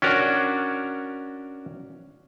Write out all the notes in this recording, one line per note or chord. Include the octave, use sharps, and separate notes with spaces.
C#4 D4 F#4 A#4